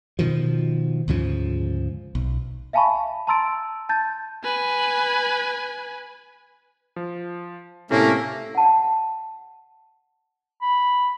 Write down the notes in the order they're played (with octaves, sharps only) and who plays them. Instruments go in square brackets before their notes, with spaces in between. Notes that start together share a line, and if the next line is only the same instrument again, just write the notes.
[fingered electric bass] B2 D#3 F3
D2 G#2 C#3 F3
B1
[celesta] E5 F5 G#5 A5 B5 C#6
A5
A5 A#5 C6 E6 A6 D7
A5 G6 A6
[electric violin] B4 G#5
[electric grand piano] F3
[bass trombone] A2 [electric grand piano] C3 [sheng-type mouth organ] A3 C#4 [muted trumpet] A#3
[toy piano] F#5 A5
[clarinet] B5